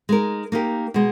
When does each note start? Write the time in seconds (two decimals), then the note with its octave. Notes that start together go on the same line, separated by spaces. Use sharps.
0.09 G#3 D#4 A#4
0.52 A#3 D#4 G4 A#4
0.94 B2 G#3